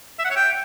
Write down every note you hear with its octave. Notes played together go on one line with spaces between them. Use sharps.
E5
F#5
C#5
G5